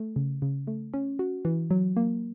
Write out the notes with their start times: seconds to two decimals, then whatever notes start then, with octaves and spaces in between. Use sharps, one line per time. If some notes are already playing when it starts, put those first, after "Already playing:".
Already playing: A3
0.16 C#3
0.42 C#3
0.67 A3
0.94 C#4
1.19 F#4
1.45 E3
1.71 F#3
1.97 A#3